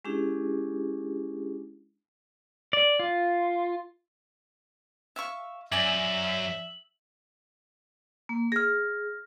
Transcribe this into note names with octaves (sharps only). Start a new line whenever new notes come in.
G#3 C#4 D4 E4 G4 G#4
D5
F4
E5 F5 C#6
F#2 D5 E5 G#5 D6 F#7
A#3
G#4 F6 A#6